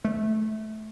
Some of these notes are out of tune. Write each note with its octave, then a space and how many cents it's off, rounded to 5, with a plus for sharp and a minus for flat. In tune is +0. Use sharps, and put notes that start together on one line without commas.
A3 -20